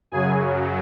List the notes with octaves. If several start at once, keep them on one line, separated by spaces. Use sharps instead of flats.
F#2 C#3 F#3 G#4 G#5